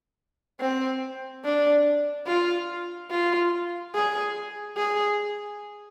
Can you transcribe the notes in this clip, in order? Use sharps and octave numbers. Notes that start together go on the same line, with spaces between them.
C4
D4
F4
F4
G#4
G#4